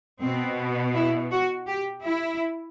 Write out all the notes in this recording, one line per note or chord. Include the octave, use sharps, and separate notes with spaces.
B2 C4
E4
F#4
G4
E4